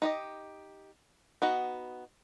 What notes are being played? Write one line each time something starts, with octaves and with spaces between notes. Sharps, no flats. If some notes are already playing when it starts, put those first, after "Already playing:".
D#4 G4 D#5
B3 D#4 F#4